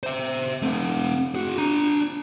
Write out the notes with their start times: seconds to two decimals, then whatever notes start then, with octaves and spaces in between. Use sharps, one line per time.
0.03 C5 E5
0.62 A3 C4
1.35 F#4 G#4
1.58 D4 A#5